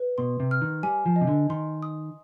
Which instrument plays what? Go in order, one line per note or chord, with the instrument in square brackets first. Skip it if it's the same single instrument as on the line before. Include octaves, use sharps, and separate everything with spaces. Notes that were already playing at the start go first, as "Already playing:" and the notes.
Already playing: [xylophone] B4
[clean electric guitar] B2 [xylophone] C6
[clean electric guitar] C3
[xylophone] F6
[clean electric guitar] D#3
[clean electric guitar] G3 [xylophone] G#5
[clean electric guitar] F3
[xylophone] D#5
[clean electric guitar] C3
D3
[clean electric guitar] D#3 [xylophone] C6
[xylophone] D#6